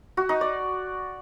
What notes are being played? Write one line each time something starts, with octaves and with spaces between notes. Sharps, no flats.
F#4
D#4
D5